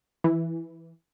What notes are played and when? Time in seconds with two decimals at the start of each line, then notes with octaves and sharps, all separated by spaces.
0.24 E3